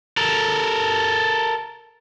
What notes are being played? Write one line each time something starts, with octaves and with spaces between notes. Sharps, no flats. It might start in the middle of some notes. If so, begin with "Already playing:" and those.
A4 A#4